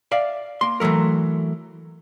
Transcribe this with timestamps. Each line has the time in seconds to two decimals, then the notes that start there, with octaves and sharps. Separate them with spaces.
0.12 D5 E5 F5
0.61 A#3 C6
0.80 E3 F#3 G#3 A3 A#4